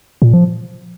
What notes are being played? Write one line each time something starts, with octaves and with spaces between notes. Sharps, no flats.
A#2
F3